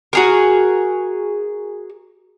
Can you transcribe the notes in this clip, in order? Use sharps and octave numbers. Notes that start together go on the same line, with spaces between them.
F#4 G#4 A#4